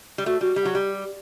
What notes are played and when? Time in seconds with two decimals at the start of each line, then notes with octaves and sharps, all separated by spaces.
0.18 G3
0.26 A3 F#4
0.41 G3 F#4
0.56 G3 G4
0.65 F#3
0.75 G3